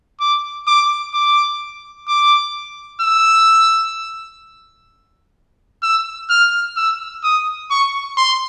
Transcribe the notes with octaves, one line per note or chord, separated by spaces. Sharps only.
D6
D6
D6
D6
E6
E6
F6
E6
D#6
C#6
C6